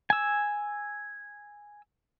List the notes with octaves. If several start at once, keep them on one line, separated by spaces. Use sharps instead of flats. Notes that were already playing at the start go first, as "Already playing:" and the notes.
G#5 E6